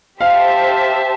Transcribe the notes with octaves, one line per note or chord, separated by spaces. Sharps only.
G4 C5 E5 F5 A5